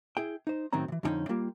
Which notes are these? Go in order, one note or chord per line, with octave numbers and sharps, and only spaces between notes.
E4 G#4 G5
D#4 C5
A2 D#3 F#3 C4 C#4 A#5
C#3 E3
F2 D3 F#3 C#4 D#4 G5
G3 A#3 F4 G4